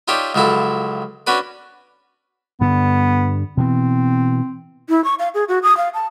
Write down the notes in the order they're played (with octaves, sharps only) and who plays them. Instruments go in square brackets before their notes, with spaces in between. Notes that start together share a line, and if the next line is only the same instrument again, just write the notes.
[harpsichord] D#4 F4 G4 C#5 D5 E5
C#2 F3 F#3 E4 A4
C#4 D4 F#4 B4 D5
[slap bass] G2 D3 [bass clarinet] B3
[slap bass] B2 E3 [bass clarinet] C4
[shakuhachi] E4
C#6
F5
G#4
F#4
D#6
F5
A5